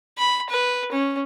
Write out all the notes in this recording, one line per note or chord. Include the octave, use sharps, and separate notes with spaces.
B5
B4
C#4